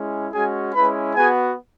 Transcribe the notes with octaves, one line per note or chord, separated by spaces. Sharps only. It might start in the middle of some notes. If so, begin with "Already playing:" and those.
Already playing: G#3 C#4 E4
G#3 C#4 F#4 G#4 G#5
G#3 C#4 E4 B4 B5
B3 F#4 G#4 G#5